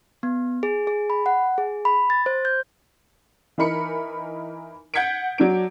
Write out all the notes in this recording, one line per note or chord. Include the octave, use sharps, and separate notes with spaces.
B3
G#4
G#4
B5
F#5
G#4
B5
A6
C5
G6
E3 D#4 A#4 B5 C#7
F#5 G6 G#6 B6 C#7 D7
F#3 D4 D7